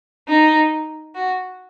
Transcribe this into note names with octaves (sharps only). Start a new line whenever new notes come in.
D#4
F#4